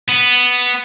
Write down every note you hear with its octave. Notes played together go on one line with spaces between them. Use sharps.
B3